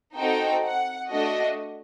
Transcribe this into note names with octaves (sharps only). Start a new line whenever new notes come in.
C4 D#4 F#4 A4 G5
F#5
A3 D4 F#4 D#5